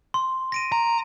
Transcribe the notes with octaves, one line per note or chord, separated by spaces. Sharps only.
C6
A#6 D7 D#7
A#5